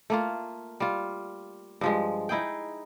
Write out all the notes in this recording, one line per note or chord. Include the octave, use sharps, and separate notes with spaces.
A3 A#3 F4
G3 F4
G2 F3 G#3
D#4 E4 G#4 G5